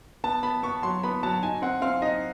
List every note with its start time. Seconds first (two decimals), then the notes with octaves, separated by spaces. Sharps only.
0.24 B3 A5
0.43 B3 B5
0.63 B3 C#6
0.83 F#3 C6
1.03 B3 B5
1.23 F#3 A5
1.43 D#4 G#5
1.62 C4 F#5
1.82 C4 F5
2.02 D#4 D#5